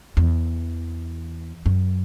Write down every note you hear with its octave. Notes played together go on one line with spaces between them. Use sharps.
E2
F#2